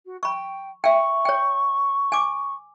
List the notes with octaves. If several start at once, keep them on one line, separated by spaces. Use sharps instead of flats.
F#4
G5 B5 C#6
E5 G5 C#6
C#5 G5
G#5 D6